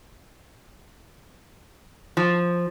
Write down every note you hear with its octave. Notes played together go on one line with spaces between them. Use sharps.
F3